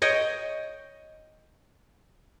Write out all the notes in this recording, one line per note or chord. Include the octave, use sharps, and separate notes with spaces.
C#5 D#5 G5